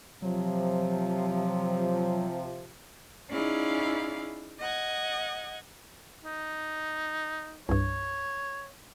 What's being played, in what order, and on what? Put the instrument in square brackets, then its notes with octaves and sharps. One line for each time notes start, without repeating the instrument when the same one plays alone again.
[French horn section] C3 F3 [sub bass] F#3
[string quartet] C#4 D#4 E4 G#4 D5 F5
D#5 F#5 G#6
[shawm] D#4
[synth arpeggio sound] C2 G2 [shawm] C#5